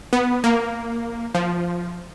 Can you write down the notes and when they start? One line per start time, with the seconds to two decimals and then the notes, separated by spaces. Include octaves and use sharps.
0.13 B3
0.44 A#3
1.35 F3